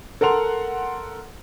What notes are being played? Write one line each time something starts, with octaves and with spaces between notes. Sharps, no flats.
A4 A#4 F#5 C6 F7